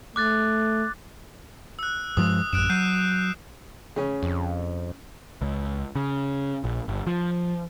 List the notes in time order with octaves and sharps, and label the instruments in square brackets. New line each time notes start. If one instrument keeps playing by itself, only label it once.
[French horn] A3 [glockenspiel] D6 F#6 A6
[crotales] E6 F#6
[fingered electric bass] G2 F3 G#3 [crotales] D#6
[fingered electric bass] A1 F#2 [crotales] F#6 D7 E7
[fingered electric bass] F#3 [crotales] G6 C7 D#7
[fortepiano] C#3 C#4
[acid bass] F2
[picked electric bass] C#2
C#3
A#1
G1
F3